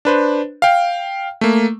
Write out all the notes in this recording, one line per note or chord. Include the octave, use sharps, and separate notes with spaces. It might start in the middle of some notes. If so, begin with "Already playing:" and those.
D4 B4 C5
F5 G5
A3 A#3